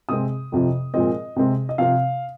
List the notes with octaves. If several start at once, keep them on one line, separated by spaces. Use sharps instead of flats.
C3 G#3 C4 D#6
F2 C3 F3
A#2 F3 G#3 C4 D#5
C3 G#3 C4
D#5
C3 F3 C4 F5